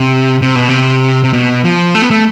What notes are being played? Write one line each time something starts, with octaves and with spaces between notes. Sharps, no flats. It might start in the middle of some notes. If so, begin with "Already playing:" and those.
Already playing: C3
C3
B2
C3
C3
B2
F3
A3
B3
A3